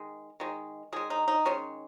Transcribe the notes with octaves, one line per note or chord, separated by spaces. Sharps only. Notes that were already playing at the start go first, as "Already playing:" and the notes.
Already playing: D#3 G#3
D#3 G#3
D#3 G#3 G#4
D#4
D#4
D#3 G#3 C#4